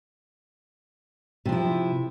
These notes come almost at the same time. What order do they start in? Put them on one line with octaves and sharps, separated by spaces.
C3 F3 E4